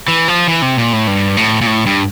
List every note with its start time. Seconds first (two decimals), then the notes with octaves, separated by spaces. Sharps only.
0.08 E3
0.28 F3
0.48 E3
0.62 C3
0.78 A#2
0.93 A2
1.07 G2
1.37 A2
1.61 A#2
1.67 A2
1.86 G2